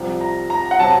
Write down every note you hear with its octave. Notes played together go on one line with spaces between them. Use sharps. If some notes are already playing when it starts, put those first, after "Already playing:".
Already playing: C2 C3 F3
A#5
A#5
F#5
C3 F#3 A5